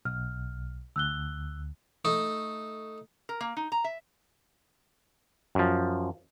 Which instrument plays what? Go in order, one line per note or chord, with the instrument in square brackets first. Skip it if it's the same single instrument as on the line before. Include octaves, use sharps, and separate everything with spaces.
[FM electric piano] B1 [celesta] F6
[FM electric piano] D2 [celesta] E6 F#6 G7
[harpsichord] A3 D#4
[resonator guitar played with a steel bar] A#4
A#3
D#4
A#5
E5
[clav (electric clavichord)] F#2 F3